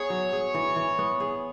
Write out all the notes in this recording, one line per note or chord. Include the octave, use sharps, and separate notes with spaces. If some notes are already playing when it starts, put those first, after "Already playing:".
Already playing: B3 G#4 C#5
F#3
G#4
E3
E3
B3
G#4